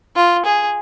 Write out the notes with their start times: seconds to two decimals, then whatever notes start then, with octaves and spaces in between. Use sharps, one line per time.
0.16 F4
0.45 G#4